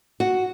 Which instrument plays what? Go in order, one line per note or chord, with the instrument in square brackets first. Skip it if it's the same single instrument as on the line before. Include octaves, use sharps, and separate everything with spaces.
[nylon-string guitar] F#4